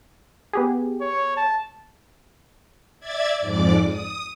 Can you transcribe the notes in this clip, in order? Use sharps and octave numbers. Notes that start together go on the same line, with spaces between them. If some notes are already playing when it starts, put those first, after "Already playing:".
B3 G4 G#4
C#5
A5
D5 E5 G#6 A6
F2 G#2 D5 D6
D#6